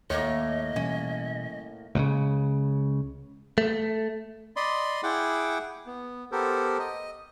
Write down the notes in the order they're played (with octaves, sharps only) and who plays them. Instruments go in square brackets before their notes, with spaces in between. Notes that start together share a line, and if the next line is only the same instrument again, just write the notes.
[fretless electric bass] D#2 [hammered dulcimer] A2 A#3 [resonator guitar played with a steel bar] C#5 [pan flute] D#5
[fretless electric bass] B2 E3 G3 [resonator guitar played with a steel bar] C#4
[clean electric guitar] C#2 A#2 C#3
A3
[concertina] D5 D#5 B5 C6
E4 G#4 F#5 G5 D6
B3
B3 G4 A4 A#4 C5
D#5